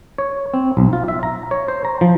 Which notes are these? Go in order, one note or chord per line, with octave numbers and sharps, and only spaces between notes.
C#5
C4
B1
F4
E5
A#5
C#5
C5
A#5
F3